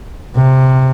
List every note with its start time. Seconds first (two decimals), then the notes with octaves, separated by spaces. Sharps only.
0.35 C3